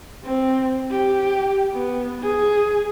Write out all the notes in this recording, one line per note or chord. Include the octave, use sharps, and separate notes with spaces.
C4
G4
B3
G#4